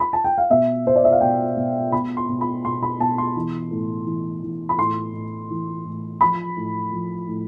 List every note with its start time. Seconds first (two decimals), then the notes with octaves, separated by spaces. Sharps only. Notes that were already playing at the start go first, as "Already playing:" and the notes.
0.00 B5
0.13 A5
0.24 G5
0.38 F5
0.50 B2 E5
0.86 B2 C5
0.96 D5
1.04 E5
1.12 F5
1.21 B2 G5
1.57 B2
1.92 B2 B5
2.17 C6
2.29 B2
2.41 B5
2.65 B2 C6
2.83 B5
3.00 B2 A5
3.18 C6
3.36 E3
3.71 A2
4.07 E3
4.43 E3
4.69 B5
4.78 A2 C6
5.13 A2
5.50 E3
5.86 A2
6.21 F3 B5
6.56 A2
6.92 F3
7.28 A2